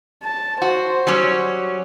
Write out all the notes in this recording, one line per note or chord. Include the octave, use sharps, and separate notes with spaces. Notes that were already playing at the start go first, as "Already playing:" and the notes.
A5
F#4 C5
F#3 G3 C#4